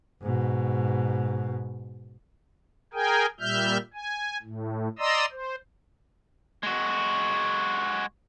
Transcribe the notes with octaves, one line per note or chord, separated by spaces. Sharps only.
G#2 B2
G#4 A#4 G5 G#5
A#2 G3 E5 F6 G6
G#5
A2
D5 D#5 A#5 C6 D#6 E6
C5
G#3 F#4